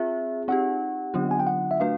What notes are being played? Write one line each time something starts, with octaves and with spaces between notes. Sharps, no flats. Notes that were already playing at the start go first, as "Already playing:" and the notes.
Already playing: C4 F4 G#4 E5
C4 D#4 G4 F#5
D3 F#3 B3 D4 F4
G#5
G5
F#5
E5
A3 D4 F#4 B4 F5